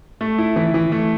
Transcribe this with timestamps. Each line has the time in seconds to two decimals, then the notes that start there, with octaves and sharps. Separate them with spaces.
0.21 A3
0.38 E4
0.56 E3
0.74 E3
0.92 A3